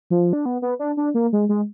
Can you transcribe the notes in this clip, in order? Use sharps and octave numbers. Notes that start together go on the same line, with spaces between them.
F3
D4
B3
B3
D4
D4
A#3
G#3
G#3